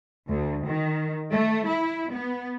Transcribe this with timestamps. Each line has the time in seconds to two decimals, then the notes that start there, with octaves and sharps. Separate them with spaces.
0.28 D2
0.65 D#3
1.32 A3
1.67 E4
2.11 B3